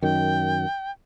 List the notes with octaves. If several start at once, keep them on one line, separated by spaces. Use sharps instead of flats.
F#2 D#3 G5